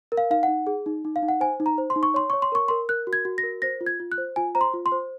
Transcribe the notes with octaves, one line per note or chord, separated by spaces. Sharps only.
A#4
F5
D#4 F5
D#4 F#5
G#4
D#4
D#4
F5
D#4
F#5
C5 G#5
D#4
A#5
C5
C6
D#4
C#6
C#5 C6
C#5 C#6
C6
A#4 C#6
A#4 C6
A#4 F#6
F#4
G#6
F#4
A#6
A#4
C5 A#6
F4
G#6
F4
F#6
C5
F4 G#5
C5 A#5
C6
F4
C6
C5